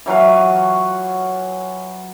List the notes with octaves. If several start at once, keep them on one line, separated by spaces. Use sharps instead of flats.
E3 F#3 B4 F5